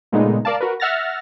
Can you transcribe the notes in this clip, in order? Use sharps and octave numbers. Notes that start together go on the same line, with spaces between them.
A#2 C#3 G#3 A3 B3 D#4
A#4 D5 F5 A5
F#4 A#4 B4
E5 F#5 F6 A6 A#6